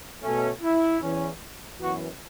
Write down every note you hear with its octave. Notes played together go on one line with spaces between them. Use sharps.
B2 A3 C#4
E4
E2 E3 C#4
F#2 E3 B3 F#4